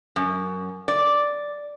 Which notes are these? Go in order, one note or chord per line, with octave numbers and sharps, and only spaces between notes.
F#2
D5